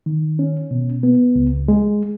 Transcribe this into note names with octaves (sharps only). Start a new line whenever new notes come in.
D#3
C#4
B2
B3
C#2
G#3